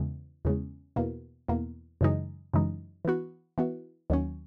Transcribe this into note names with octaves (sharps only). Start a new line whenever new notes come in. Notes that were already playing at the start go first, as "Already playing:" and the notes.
Already playing: E2 C#3 G#3
E2 C#3 G#3
E2 B2 A#3
E2 B2 A#3
F#2 C#3 E3 G#3 D#4
F#2 C#3 E3 G#3 D#4
E3 B3 F#4
E3 B3 F#4
D#2 D#3 F#3 C#4